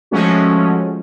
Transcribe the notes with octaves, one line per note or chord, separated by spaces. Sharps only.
F3 G#3 A3 C#4 F#4